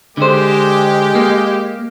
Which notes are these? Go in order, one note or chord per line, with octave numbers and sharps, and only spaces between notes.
D3 G#3 G4 C5
A#3